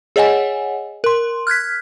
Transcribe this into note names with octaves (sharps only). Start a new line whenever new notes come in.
G#4 C#5 D#5 F#5 G#5
A#4 C6
F6 F#6 G#6 B6